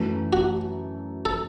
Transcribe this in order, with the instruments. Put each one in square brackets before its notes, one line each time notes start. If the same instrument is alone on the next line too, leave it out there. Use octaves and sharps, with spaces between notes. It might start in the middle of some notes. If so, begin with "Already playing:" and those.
Already playing: [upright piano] F#2 E3 A3
[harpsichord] F#4
A4